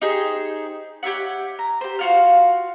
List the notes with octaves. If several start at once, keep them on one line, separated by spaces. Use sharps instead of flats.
D#4 G4 G#4 C5
G4 C#5 E5 F#5
A#5
G4 C5
F4 F#4 F5